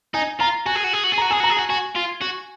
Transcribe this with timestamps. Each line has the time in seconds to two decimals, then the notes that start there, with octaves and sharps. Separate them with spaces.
0.14 D#4 G#5
0.40 F4 A#5
0.66 F#4 G#5
0.75 G#4
0.84 F#4
0.93 G#4
1.04 F#4
1.12 G#4
1.18 F#4 A#5
1.31 G#4 G#5
1.40 F#4 A#5
1.49 G#4
1.57 F#4 G#5
1.69 F#4 G#5
1.95 F4
2.21 F#4